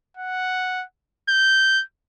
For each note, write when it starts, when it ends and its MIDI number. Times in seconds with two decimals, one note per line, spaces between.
0.17 0.84 78
1.29 1.83 91